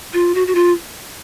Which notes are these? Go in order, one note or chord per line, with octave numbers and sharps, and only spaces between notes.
F4
F#4
F#4
F4